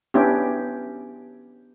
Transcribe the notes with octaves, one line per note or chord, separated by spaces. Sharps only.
B3 C#4 D4 E4 G4